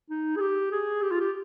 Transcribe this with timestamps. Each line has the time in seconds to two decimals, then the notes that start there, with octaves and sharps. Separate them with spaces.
0.10 D#4
0.36 G#4
0.41 G4
0.72 G#4
1.02 G4
1.11 F4
1.20 G4